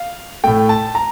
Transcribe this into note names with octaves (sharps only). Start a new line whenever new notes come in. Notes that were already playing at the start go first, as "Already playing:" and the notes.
Already playing: F5
A2 A3 G5
A5
A#5